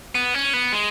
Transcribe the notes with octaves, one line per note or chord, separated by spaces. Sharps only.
B3
C#4
B3
G#3